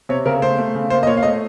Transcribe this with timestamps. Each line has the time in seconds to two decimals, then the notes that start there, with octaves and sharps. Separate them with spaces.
0.09 C3 C#5
0.26 C#3 A#4
0.42 A3 C5
0.58 A3
0.75 C#3
0.90 A#3 C5
1.03 D#5
1.06 A#2 C#5
1.17 F5
1.23 A3 D#5